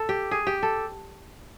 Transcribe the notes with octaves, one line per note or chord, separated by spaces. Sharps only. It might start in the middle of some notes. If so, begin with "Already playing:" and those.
Already playing: A4
G4
G#4
G4
A4